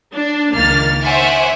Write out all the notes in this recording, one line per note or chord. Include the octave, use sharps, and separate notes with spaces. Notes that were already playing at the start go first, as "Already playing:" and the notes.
D4
C#2 D#3 A#3 F6 A6
C5 C#5 E5 F#5 G#5 D6